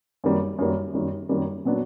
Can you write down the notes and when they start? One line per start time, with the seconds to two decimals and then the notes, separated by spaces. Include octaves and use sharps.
0.24 F#2 D#3 G3 A#3
0.59 F#2 D#3 G3 A#3
0.94 F#2 D#3 G3 A#3
1.29 F#2 D#3 G3 A#3
1.65 A#2 F#3 B3 D4